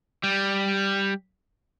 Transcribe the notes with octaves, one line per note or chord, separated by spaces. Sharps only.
G3